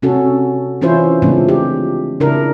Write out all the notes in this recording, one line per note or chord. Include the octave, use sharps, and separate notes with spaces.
C3 C#4 F#4 A4
E3 C#4 E4 F4 C5
C#3 F3 G#3 A3 C4 D4
G4
C#3 D4 E4 A#4